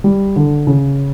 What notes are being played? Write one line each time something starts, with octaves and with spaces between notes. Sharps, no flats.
G3
D3
C#3